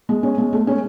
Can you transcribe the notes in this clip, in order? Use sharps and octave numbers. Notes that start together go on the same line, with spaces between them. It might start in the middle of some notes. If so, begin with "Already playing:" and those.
G#3
C#4
G#3
A3
C#4